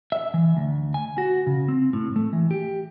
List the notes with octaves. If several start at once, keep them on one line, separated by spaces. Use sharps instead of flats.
E5
E3
D2
G#5
F#4
C#3
C4
A2
A3
E3
G4